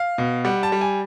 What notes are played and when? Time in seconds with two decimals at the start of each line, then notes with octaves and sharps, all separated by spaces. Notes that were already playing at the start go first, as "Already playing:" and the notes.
Already playing: F5
0.18 B2
0.45 G3 F#5
0.63 A5
0.72 G3
0.81 G#5